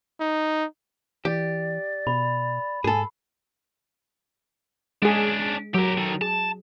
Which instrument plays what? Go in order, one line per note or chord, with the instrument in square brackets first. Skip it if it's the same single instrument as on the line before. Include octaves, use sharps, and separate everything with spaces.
[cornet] D#4
[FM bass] E3 [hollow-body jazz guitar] G4 [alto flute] D5
[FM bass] B2 [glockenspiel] B5
[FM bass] G#2 [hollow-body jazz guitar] G#4 A4 [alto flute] G#5
[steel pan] G#3 G#4 [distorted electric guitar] C#4 D4
[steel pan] F#3 [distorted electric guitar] G4 A#4
[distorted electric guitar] D#3 A3
[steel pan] G#4 [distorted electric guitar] A5